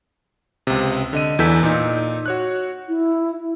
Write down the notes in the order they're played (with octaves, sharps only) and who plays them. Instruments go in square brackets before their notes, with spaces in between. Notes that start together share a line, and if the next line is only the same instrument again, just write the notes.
[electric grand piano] C#2 C3
D3 D#5 D#7
E2 E3 A4 E6 G6 B6
A#2 D#4
F#4 C#5 F#6
[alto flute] E4